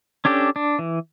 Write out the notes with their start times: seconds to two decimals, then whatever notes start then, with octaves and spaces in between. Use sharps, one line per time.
0.25 C#4 D4 G4 A4
0.56 D4
0.79 E3